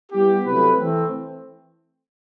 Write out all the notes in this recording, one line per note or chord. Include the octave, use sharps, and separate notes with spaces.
G3 B3 E4 G4
C3 F#3 A3 E4 B4
E3 A3 C4